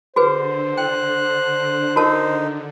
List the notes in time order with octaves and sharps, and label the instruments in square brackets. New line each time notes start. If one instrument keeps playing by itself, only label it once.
[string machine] D3 [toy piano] F#4 G#4 B4 [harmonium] C5
[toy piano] G5 [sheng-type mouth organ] F#6
[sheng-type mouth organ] D#4 [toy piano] F#4 A#4 A5